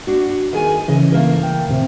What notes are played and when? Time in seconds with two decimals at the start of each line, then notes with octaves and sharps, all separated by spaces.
0.07 D4 F#4
0.53 D#3 G#4 G#5
0.88 C#3 E3 D#5
1.12 A3 A#3 A#4
1.43 G5
1.68 D#2 A2 C3